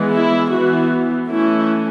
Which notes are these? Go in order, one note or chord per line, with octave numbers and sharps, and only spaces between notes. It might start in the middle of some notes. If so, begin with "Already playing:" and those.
Already playing: E3 G#3 B3
E4
E3 B3 F#4
E3 A3 C#4 E4